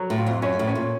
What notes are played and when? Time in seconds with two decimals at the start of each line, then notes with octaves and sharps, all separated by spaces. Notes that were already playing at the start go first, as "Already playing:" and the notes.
Already playing: F#3
0.10 A2
0.18 F4
0.26 F2
0.42 F#2 C#4
0.59 A2
0.68 C#4
0.75 A#2